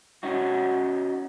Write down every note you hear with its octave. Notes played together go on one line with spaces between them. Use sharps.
C#4 D#4 F#4